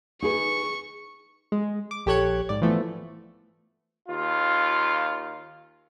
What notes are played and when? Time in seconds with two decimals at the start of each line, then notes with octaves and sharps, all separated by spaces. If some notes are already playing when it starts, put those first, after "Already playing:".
0.22 D#4 G#4 B4 C#6
1.52 G#3
1.91 D6
2.06 A#1 G4 A4 C#5 F#6 G#6
2.49 G#2 D5
2.62 E3 F3 A3 B3
4.09 D#2 F4